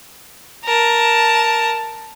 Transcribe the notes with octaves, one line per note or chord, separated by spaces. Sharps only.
A#4 A5